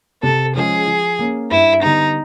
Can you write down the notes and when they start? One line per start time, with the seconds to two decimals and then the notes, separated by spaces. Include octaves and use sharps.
0.23 C3 A4
0.56 F3 G#3 C#4 G#4
0.87 F3
1.19 A#3 C#4
1.51 G2 E4
1.82 D3 G3 B3 D#4